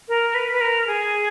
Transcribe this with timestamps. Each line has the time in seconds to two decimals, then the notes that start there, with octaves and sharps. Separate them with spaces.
0.09 A#4
0.35 B4
0.53 B4
0.61 A#4
0.87 G#4